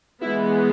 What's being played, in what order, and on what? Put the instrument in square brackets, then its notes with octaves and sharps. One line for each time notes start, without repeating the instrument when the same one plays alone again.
[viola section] E3 G#3 B3 E4